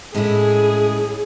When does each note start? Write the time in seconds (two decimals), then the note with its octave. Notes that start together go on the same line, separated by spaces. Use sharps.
0.14 A2 G#3 C#4 E4 G#4